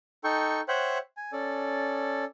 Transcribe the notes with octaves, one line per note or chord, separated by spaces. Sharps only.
D#4 A4 G5 C#6
C5 C#5 E5 F#5 G5 F#6
G#5
C#4 A4 D5